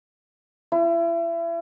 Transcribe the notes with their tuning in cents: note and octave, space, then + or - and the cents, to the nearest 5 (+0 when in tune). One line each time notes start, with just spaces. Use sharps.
E4 +35